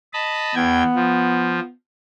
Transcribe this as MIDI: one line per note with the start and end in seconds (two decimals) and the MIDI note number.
0.13 0.55 75
0.13 0.55 81
0.13 0.55 83
0.55 0.83 40
0.55 1.72 59
0.55 0.83 79
0.55 0.83 92
0.95 1.60 53